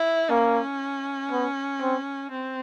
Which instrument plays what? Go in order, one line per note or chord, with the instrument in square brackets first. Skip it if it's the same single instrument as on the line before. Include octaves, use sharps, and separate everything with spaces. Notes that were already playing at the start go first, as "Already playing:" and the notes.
Already playing: [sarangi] E4
[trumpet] A#3 [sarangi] C#4
[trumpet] B3
C4
[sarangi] C4